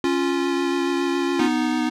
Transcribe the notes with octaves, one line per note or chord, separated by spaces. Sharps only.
C#4 F4
B3 D#4